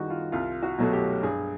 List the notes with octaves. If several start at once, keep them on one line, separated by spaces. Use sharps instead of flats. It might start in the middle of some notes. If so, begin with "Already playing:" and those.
Already playing: F#2 D#3 G3 F#4 G#4
F4
C2 F4
F#4
B2 F#3 A3
G4
G2 G#4